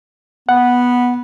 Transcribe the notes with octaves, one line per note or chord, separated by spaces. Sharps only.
B3 F#5